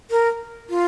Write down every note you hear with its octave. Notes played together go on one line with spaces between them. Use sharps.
A#4
F4